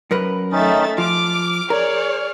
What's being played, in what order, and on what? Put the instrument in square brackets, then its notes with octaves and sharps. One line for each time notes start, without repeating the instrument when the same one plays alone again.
[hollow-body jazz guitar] F#2 A#4 B4
[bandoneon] D#3 C#4 D#4 [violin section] A3 E5 A6
[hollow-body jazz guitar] F3 [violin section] D6 [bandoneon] F6
[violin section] G#4 C#5 D5 [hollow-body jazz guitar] A#4